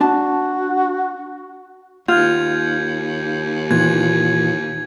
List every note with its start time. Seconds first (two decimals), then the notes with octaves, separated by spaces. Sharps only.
0.01 D4 F#4 A5
2.08 D#2 F4 G6 G#6
3.71 A#2 E3 G#6